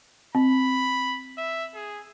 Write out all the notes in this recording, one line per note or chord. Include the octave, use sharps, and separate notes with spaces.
C4 B5
E5
G#4